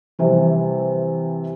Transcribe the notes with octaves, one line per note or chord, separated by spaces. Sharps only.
C3 E3 G3